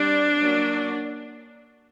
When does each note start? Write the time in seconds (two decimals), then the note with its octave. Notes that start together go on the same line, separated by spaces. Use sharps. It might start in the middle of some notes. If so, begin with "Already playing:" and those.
Already playing: G3 C4 D4
0.39 F#3 A#3 C#4